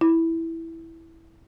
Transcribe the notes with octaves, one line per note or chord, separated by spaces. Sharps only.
E4